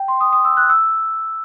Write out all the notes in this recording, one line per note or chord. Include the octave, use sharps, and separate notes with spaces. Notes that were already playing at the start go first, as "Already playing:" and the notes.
Already playing: G5
C6
D#6
D#6
E6
F#6
E6